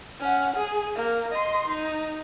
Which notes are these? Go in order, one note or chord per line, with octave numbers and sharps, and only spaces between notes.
C#4 F#5
G#4
A#3
D#5 C6
D#4